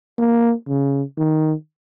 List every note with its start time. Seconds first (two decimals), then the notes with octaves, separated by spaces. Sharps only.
0.18 A#3
0.67 C#3
1.18 D#3